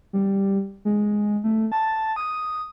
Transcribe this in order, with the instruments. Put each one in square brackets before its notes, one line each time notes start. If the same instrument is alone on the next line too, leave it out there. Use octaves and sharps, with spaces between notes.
[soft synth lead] G3
G#3
A3
A5
D#6